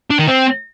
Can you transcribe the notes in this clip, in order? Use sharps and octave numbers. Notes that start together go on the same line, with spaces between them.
D4
D#3
C4